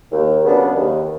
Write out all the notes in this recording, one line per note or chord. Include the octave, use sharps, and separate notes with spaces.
D#2
C#3 F#3 B3 D4
D#2